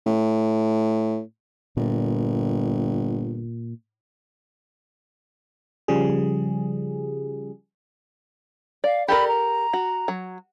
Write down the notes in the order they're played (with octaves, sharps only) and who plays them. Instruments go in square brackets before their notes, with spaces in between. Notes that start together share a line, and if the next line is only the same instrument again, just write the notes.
[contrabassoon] A2
[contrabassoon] G1 [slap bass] A#2
[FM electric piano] C#3 F3 G3 G#4
[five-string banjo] D5 [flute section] F5
[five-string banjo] G4 A4 A#4 [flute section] D5 B5
[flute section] A#5
[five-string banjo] F#4
F#3